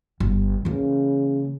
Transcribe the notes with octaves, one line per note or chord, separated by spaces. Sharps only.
G1
C#3 E3 A#3